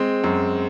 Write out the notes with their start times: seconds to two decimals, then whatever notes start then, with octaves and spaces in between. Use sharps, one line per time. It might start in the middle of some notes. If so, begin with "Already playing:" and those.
Already playing: G#3 C4
0.24 F#2